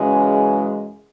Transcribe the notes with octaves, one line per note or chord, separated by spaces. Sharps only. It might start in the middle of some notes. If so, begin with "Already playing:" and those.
Already playing: F#2 C#3 E3 G#3